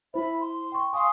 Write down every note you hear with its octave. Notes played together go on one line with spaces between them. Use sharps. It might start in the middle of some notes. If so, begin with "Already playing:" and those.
E4 C5 E5 B5
C6
G5 C#6
F5 G#5 C6 C#6 D#6